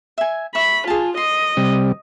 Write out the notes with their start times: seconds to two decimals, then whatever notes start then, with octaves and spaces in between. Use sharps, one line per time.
0.18 E5 G#5
0.55 E5 B5 C#6
0.87 F4 G#4 A5
1.17 D#5 C6
1.57 C3 G3